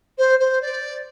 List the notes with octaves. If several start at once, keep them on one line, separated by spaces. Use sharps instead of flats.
C5
C5
D5